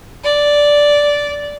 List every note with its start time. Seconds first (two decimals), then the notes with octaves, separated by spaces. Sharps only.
0.24 D5